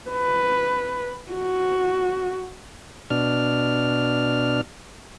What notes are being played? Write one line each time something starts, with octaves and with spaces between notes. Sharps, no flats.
B4
F#4
B2 D4 F6